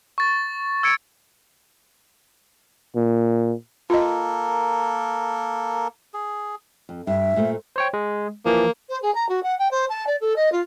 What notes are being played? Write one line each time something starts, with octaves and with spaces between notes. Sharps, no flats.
C#6 A6
E6 G#6 C#7 D7
A#2
A#3 F4 A4 A#4 D#5
G#4
F2
G2 E5
A#2 A3 C5
C5 C#5 G5
G#3
E3 F3 A#3
C5
G#4
A#5
F#4
F#5
G5
C5
A5
D5
A4
D#5
F4